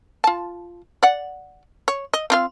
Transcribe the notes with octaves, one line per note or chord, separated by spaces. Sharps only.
F4 A5
D5 F#5
C#5
D#5
C4 F4 F5